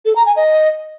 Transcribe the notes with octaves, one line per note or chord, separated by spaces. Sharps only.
A4
A#5
G#5
D#5